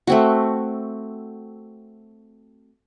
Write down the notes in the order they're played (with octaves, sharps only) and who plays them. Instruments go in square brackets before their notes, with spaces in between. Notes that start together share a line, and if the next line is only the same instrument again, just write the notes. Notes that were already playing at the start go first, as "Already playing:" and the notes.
[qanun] A3 C4 F#4